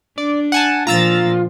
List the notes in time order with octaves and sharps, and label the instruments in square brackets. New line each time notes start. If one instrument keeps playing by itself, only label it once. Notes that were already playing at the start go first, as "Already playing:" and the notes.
[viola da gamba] D4 [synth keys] D5
[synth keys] F#5 G#5 A5
[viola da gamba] A#2 F3 [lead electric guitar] F4 [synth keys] A#5 E6 A6